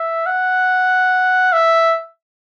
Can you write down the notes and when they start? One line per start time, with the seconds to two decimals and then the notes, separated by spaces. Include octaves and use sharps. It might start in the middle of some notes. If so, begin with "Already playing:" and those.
Already playing: E5
0.26 F#5
1.53 E5